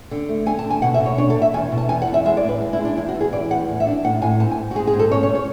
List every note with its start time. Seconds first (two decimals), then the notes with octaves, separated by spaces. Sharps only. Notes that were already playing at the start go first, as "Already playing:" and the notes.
0.11 D3
0.29 A3
0.46 D3 G#5
0.59 A5
0.65 D3
0.70 G#5
0.82 B2 F#5
0.94 E5
1.00 B2
1.06 C#5
1.18 D4 C#5
1.30 A4
1.36 B2
1.42 E5
1.54 E2 G#5
1.72 B2
1.78 A5
1.89 E2 G#5
2.02 F#5
2.07 E2
2.14 E5
2.25 G#3 E5
2.37 D5
2.43 A2
2.49 B4
2.61 G#3
2.73 E4
2.79 G#3
2.85 D4
2.97 E2 E4
3.09 F#4
3.15 E2
3.21 G#4
3.33 E3 D5
3.51 E2 F#5
3.69 A2
3.80 E5
3.86 D4
4.04 A2 F#5
4.22 A2 G#5
4.40 G#2 A5
4.51 G#5
4.58 G#2
4.71 F#4
4.75 G#3 G#4
4.87 G#4
4.94 G#2
4.99 A4
5.11 C#4 C#5
5.23 C#5
5.29 C#4
5.35 C#5